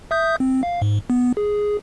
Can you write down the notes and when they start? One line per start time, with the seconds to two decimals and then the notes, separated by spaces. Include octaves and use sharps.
0.11 E5 D#6 G6
0.40 C4
0.63 F5
0.82 G#2
1.10 B3
1.37 G#4